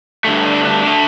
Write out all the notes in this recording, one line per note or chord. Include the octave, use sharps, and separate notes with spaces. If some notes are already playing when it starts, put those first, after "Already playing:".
G2 D3 A3
D4
D4
D3 A3